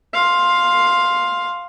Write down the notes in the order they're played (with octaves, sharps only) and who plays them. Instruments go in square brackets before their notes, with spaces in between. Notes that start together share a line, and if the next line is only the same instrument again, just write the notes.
[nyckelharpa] F5 C6